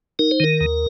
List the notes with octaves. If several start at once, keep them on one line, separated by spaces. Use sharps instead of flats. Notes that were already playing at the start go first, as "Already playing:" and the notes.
D#4 A#4
C5
D#3 A#4
D#2